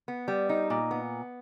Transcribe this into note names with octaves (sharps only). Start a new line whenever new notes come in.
B3
G3
D#4
A#2
B3